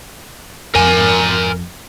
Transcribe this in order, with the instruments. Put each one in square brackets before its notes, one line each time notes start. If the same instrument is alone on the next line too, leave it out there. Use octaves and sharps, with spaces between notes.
[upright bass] F2 [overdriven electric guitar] A#4 G#5